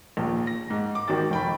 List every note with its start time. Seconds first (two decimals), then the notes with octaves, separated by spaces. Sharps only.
0.17 A#1 D#2
0.47 A#6
0.70 G#2
0.95 D6
1.08 G#1 D#3 F#4 G5 A6
1.31 F1 G5 B5